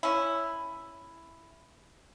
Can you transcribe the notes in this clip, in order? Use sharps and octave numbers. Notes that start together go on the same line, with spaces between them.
C#4 E4